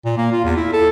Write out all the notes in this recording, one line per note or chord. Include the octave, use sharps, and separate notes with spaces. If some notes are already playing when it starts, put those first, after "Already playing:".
A#2
A#3
F4
E2
E4
A4